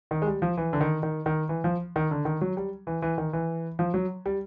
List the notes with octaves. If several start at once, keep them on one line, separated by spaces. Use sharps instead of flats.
D#3
G#3
G3
F3
E3
D3
D#3
D#3
D#3
E3
F3
D#3
D3
D#3
F#3
G3
E3
E3
D#3
E3
F3
F#3
G3